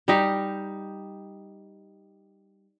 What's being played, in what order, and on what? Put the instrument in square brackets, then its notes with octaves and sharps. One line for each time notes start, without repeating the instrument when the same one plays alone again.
[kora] G3 D#4 G4